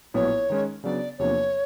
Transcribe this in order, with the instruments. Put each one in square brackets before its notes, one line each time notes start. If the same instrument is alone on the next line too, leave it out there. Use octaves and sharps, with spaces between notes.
[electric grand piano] A#1 A2 F#3 B3 E4 [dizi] C#5
[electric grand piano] D#3 G#3 C#4
[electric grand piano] C#3 F#3 B3 D4 [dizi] D5
[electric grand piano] E2 C3 F3 A#3 D4 [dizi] C#5